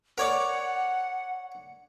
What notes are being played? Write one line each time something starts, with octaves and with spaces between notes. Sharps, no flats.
A#4 C#5 D5 F#5